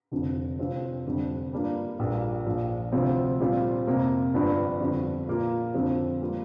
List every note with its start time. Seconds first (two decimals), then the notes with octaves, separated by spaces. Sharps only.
0.11 F1 F2 D3
0.59 F1 F2 F3 C4 F4
1.06 F1 F2 D3 G3
1.52 G2 G3 A#3 D4 F4
1.99 A#1 A#2 G3 A#3
2.46 A#1 A#2 F3
2.92 D2 C3 F3 C4 F4
3.40 A#2 G3 C4 F4
3.87 F2 C3 A#3
4.34 G1 G2 F3 D4 F4
4.80 F2 D3 G3
5.27 A#2 A#3 F4
5.74 F2 D3 F3 C4 F4
6.22 G3 A#3 F4